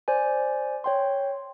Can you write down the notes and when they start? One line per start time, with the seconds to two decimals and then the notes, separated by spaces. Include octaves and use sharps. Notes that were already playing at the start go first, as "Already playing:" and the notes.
0.08 C5 D5 G#5
0.84 C#5 G5 C6